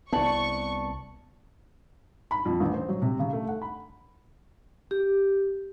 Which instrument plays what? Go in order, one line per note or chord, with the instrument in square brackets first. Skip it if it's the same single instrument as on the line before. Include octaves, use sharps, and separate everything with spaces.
[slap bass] C2 B3 [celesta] E4 D5 F#7 [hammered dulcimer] A5 D6 [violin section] C#6
[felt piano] B5
F2
A1
C5
F#3
C3
C#3
A3
F#5
B5
[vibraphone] G4